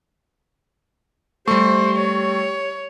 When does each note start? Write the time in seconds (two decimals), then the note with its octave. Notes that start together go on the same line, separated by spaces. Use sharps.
1.48 G3 A3 G4 C5 C#6
1.98 C#5